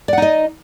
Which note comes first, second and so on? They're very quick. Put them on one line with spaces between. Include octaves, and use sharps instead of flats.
D5 F#5 D#4 D#5